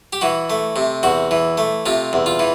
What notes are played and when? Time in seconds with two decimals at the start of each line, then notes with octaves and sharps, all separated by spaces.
0.13 G4
0.21 E3 F#4
0.50 A3
0.76 C3
1.03 E2 F#4
1.31 E3
1.58 A3
1.86 C3 F4
2.13 E2
2.26 F4
2.39 E3